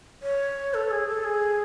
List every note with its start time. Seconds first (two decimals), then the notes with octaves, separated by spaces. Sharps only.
0.23 C#5
0.74 A4
0.91 G#4
1.08 A4
1.24 G#4